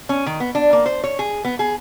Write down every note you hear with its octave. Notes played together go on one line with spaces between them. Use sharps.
C#4
D#3
B3
D4
A#3
C5
C#5
G#4
B3
G#4